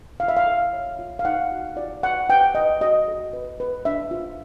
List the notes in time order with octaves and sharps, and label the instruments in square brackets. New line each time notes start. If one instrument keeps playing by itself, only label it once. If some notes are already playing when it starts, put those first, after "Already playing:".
[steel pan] E4 F5
E5
F5
A4
C#5
F4
F5
D#4 F#5
F#4
F4 D5
A4 F#5
B4 G5
B4 D#5
F#4 D#5
A4
B4
B4
D4 E5
F4